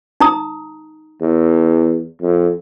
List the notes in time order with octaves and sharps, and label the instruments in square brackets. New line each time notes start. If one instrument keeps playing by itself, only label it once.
[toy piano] D#4 A#5 D#6
[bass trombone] E2
F2